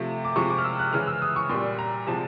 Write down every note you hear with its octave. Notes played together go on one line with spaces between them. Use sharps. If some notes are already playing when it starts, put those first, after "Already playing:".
Already playing: C3 F3 A3
D6
C3 F3 G#3 C#6
D6
F6
E6
F#6
C#3 E3 G#3 F6
E6
D#6
C#6
A#2 G3 C6
A#5
C3 F3 G#3 A5